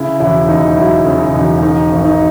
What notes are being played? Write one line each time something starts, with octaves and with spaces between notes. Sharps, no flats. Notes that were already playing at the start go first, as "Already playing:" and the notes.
Already playing: C#3 E4
E1 E4
D#2 D#4
F#3 E4
C#3
D#4
E1
D#3 D#4
G#1
D#4